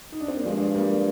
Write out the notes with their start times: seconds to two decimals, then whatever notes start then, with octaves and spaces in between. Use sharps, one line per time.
0.12 D#4
0.21 D4
0.28 C4
0.37 A#3
0.45 G2 F3 G#3
0.75 G3 A#3